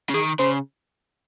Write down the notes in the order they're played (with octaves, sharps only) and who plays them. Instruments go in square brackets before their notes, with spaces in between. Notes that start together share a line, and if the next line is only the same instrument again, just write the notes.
[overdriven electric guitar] C#3
[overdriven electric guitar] D#3 [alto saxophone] G#4
[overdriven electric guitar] C#3 [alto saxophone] C5